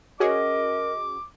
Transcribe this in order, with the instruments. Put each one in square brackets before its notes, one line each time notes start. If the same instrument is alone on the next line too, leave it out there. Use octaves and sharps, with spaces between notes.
[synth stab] C#4 F#4 G#4 [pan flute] A#4 [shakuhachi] D#5 [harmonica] D6